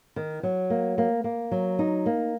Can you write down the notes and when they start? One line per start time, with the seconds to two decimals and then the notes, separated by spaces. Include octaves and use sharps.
0.16 D#3
0.43 F#3
0.70 A#3
0.98 A#3
1.24 A#3
1.51 F#3
1.79 D#4
2.06 A#3